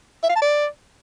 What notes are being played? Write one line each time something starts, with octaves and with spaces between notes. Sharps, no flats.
E5
F5
A5
D5